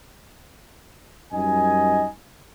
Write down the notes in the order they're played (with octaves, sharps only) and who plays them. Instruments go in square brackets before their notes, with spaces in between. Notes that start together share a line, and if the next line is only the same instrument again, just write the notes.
[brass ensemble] F#2 G3 D#4 D#5 G#5